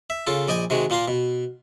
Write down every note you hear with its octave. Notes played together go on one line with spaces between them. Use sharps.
E5
C#3 F4 A4
A#1 D5 D#5 G5 G#5
C3 D#3 G#3 F#4
A#2 A#3 F4 A#5 C6
B2